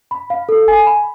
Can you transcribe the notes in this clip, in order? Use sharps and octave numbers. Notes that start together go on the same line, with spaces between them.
B5
F5
A4
G#5
B5